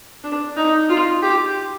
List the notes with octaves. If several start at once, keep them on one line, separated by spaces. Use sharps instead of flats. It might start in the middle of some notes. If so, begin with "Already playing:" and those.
D4
D#4
F4
G4